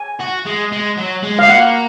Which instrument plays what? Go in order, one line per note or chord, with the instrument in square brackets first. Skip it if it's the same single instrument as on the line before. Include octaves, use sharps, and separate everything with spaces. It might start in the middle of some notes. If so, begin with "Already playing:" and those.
Already playing: [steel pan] G#5
[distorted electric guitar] F#4
G#3
G#3
F#3
G#3
[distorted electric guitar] G#3 [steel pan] F5
[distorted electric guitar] A#3 [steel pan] F#5